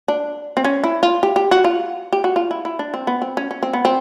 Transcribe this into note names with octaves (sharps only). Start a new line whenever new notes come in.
D4
C4
C#4
E4
F4
G4
G4
F#4
F4
G4
F#4
F4
E4
E4
D4
C4
B3
C4
C#4
C#4
C4
B3
C4